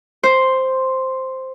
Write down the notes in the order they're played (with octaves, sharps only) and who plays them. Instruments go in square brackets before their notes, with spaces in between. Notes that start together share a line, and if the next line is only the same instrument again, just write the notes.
[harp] C5